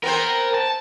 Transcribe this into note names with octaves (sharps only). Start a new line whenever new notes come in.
B3 C4 A#4 C5
A5